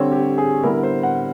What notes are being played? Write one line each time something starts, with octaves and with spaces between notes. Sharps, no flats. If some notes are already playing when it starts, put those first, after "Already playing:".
Already playing: D3 G3 C4 C#5
G4
G#4
D3 G3 B3 E4 A#4
C5
F#5